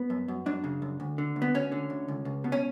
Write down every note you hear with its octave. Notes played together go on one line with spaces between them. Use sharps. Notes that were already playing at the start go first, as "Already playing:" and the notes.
Already playing: B3
F#2
F#2
F#2 D4
C#3
F#2
D2
D3
D2
B3
D2 C#4
D3
D2
C#2
C#2
B2
C#4